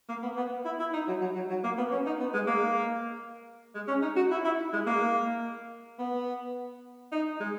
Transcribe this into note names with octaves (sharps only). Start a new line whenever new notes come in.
A#3
B3
B3
E4
E4
D#4
F#3
F#3
F#3
F#3
A#3
B3
C#4
D#4
B3
G#3
A#3
G#3
C#4
D#4
F#4
E4
E4
G#3
A#3
B3
D#4
G#3